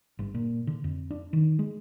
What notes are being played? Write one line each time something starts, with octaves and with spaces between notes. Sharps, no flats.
G1
A#2
D3
F2
D4
D#3
G#3